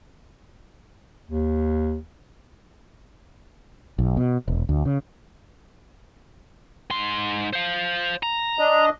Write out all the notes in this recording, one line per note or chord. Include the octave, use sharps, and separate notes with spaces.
D#2
B1
B2
E1
D2
C#3
G#2 C6
C5 F5
A#5
D4 D#5